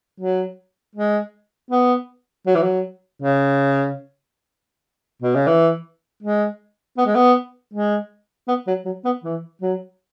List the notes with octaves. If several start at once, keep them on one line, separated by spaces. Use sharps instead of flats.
F#3
G#3
B3
F#3
E3
F#3
C#3
B2
C#3
E3
G#3
B3
G#3
B3
G#3
B3
F#3
F#3
B3
E3
F#3